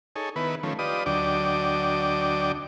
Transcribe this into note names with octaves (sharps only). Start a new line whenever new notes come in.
D#4 G#4 A4 C#5
D#3 B3 E4 B4
D#3 F3 A3 C#4
F4 G4 B4 D5 D#5 D#6
D2 F#3 D4 D#5 G5 D6